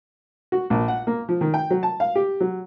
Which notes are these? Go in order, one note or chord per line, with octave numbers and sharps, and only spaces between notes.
F#4
A#1
F#5
A#3
F3
D#3
G5
F#3
A5
F5
G4
F#3